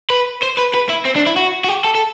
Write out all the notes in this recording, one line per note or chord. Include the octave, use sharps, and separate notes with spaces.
B4
C5
B4
B4
E4
C4
D4
E4
F#4
F#4
G4
A4
A4